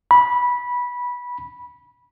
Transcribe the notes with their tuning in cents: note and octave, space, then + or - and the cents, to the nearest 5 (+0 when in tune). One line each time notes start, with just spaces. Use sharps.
B5 -15